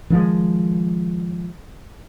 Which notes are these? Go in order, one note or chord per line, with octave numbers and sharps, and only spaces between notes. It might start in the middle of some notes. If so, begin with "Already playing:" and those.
D#3 F3 G#3